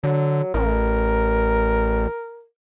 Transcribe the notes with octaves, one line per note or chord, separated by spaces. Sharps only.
D3 F#3
A1 A#4